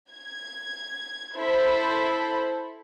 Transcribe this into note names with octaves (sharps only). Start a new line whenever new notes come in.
G#6
E4 A4 C5 B5